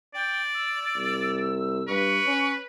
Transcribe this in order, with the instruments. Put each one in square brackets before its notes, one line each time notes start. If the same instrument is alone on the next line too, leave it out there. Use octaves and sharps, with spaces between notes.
[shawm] D5 [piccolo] G5
[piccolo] E6
[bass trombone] C2
[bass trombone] G2 [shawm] B4 [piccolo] C#6
[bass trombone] C#4